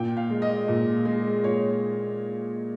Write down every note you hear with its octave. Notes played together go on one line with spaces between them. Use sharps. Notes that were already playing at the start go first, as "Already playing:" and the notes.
Already playing: A#2 G5
F5
G#3
D#5
A#2
G#3
A#2 C#5